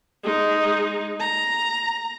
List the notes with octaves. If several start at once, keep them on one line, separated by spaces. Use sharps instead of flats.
G#3 D#4
A#5